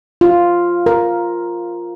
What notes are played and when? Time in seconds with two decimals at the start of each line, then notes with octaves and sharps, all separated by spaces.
0.21 F4
0.86 A#4